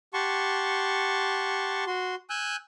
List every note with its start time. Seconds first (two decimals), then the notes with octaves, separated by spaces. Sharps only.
0.14 G4 F#5 A5 C6 C#6
1.87 F#4 C6
2.30 G#5 E6 F#6 G6